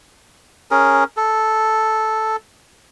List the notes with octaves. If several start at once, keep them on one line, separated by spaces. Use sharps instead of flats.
C#4 G#4 A#4
A4